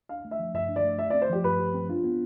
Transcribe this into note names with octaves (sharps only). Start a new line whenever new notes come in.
D4 F5
A3
E5
F3
G2 E5
D4
D5
A3
G4 E5
C4 D5
C5
F3 G4
G2 B4
G4
C4
D4 F4
B3